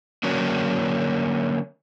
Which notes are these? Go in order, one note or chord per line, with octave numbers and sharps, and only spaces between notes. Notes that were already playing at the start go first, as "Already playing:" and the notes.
D3 F#3 A#3 C#4 D4